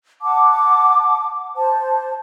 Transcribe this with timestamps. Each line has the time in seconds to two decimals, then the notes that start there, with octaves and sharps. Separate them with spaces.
0.22 F#5 A5 D6
1.56 C5 A5